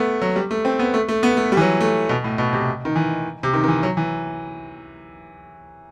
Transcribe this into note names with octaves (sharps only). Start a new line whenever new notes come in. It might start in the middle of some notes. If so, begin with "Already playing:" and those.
Already playing: A3 B3
F#3
G3
A3
C4
B3
A3
A3
B3
A3
G3
E3
F#3
A3
B2
A2
B2
C3
D#3
E3
C3
D#3
D#3
E3
F#3
E3